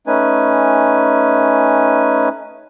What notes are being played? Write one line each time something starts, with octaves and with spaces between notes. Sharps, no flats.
A3 C#4 D#4 B4 G#5